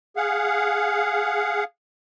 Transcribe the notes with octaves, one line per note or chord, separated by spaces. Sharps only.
G#4 F5 F#5